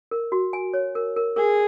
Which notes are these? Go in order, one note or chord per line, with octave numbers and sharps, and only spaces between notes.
A#4
F#4
G#5
C#5
A#4
A#4
G#4 A#4